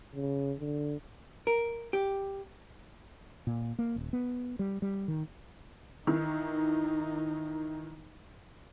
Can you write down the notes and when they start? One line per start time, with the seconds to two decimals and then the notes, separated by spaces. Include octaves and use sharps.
0.15 C#3
0.60 D3
1.47 A#4
1.93 G4
3.47 A#2
3.79 A#3
3.96 D#1
4.13 B3
4.59 G3
4.82 G3
5.08 D#3
6.07 D#3 E3 D#4